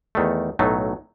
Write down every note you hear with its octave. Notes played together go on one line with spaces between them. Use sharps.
E2 D#3 A3
B1 A2 F#3 A3 D#4